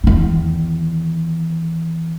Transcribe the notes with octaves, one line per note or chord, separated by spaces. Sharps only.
E2 D#3